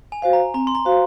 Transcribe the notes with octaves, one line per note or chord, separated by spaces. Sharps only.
G#5
F#4 C5 F5
A#5
C4 A#5
C6
A#5
F#4 C5 F5